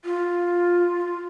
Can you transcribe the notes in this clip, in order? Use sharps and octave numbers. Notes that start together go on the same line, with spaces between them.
F4